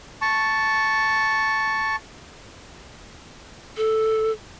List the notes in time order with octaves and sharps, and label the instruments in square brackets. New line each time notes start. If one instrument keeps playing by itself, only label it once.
[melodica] A5 C#6
[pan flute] A4